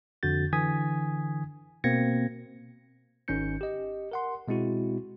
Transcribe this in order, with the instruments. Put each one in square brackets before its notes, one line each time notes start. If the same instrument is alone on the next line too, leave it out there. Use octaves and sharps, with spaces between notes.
[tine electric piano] F2 D3 F#4 G6 A6
D3 E3 G#5 D#6 G#6 B6
B2 A#3 C4 G#6 A#6 C#7
G#1 D#3 C#4 D#4 G6 C#7
G4 D#5
A#4 F#5 C6
B2 G#3 C4 E4 F#4